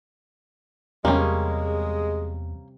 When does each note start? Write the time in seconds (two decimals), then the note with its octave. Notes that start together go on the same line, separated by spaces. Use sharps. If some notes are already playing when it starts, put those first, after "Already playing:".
1.05 E2 C3 G3 G#3 A#3 C#4